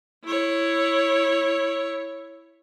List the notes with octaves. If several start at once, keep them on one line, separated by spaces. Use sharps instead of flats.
E4 C#5